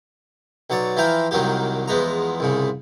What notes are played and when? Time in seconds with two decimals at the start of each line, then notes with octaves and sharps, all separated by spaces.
0.70 B1 F#3 C#5 D5
0.97 E3 F3 E4 F5 G5 A#5
1.31 C2 D#3 F#3 A#3 G4
1.88 E2 F3 G#3 B3 A#5
2.40 C2 G#2 C#3